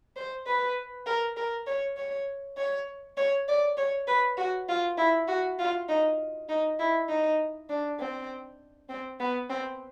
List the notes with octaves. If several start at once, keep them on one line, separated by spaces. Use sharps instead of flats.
C5
B4
A#4
A#4
C#5
C#5
C#5
C#5
D5
C#5
B4
F#4
F4
E4
F#4
F4
D#4
D#4
E4
D#4
D4
C4
C4
B3
C4